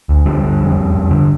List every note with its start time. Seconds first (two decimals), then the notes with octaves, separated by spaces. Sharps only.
0.09 D2
0.26 D3 G3
0.44 D3
0.61 F2
0.77 F2
0.94 F2
1.11 D3